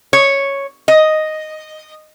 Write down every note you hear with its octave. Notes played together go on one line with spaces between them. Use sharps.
C#5
D#5